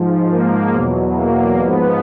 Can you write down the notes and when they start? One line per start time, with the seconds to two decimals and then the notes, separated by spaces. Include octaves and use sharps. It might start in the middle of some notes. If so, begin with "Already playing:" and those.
Already playing: G#2 F3
0.31 A#3
0.74 E2 B2 F#3
1.17 A#3
1.60 G#2 F3 B3